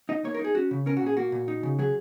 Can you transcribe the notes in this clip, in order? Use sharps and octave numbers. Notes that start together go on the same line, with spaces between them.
D#4 D#5
A#3 C#5
A#4
D#4
G#4
C#4 F#4
C#3
C#4 A#4
F#4
A#2 G#4
A#3 F#4
A#2
D#4
C#3
F#3 G#4